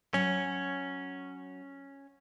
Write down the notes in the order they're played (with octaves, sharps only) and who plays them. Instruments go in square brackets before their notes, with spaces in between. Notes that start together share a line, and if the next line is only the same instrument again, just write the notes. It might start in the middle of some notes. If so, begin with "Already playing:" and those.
[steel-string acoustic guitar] F#3 F#4 [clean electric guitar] C#4